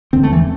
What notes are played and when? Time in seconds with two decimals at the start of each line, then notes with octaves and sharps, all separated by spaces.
0.13 E2 D3 C4
0.23 A3
0.33 E3